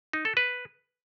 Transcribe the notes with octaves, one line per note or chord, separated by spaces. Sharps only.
D#4
A4
B4